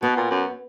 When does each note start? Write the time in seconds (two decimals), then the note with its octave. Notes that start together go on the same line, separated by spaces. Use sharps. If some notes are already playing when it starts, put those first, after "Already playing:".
0.03 B2 B3
0.16 A#2
0.31 F#2